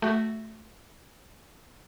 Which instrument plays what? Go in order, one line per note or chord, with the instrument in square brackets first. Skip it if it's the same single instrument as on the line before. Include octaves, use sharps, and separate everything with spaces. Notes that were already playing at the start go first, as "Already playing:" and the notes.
[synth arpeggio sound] A3 F#4